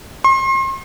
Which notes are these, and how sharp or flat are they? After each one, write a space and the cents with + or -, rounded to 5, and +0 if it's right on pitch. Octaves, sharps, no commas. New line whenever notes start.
C6 +40